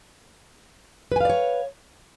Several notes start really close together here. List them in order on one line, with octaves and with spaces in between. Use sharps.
B4 G#5 F5 D5 C#5